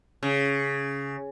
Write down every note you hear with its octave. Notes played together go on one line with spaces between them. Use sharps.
C#3